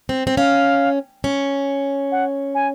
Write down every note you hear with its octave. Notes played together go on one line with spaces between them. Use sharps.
C4
C4
C#4 F5
C#4
F#5
G#5